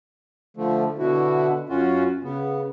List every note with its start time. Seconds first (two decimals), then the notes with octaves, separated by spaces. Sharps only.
0.57 D3 F3 A3
0.99 B2 D3 E4 F#4
1.70 F#2 C#4 F4 F#4
2.23 C#3 B3